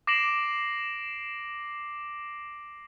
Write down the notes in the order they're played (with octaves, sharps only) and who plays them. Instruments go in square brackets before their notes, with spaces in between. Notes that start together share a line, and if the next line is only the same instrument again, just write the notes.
[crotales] D6 A#6 C7 D7 E7 F#7